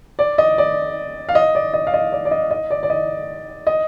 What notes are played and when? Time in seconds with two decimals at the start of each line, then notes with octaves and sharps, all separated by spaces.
0.19 D5
0.38 D#5
0.58 D5
1.29 F5
1.35 D#5
1.55 D5
1.74 D#5
1.87 F5
1.94 D#5
2.12 D5
2.25 D5
2.31 D#5
2.51 D#5
2.70 D5
2.83 D5
2.90 D#5
3.67 D#5